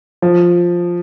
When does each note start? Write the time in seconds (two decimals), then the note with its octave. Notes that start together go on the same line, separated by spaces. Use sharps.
0.22 F3